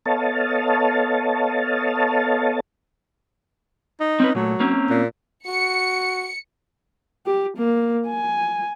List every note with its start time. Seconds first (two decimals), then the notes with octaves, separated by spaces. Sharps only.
0.06 B3 A4 C#5 D#5 F5 A5
4.00 D#4
4.20 C4 C#4 B4
4.35 A#2 F#3 A3
4.60 A#3 C4 C#4
4.90 A#2
5.46 F#4 C#7
7.26 G4
7.57 A#3
8.07 G#5